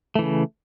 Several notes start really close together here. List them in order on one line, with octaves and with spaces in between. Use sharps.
A3 E3 C#3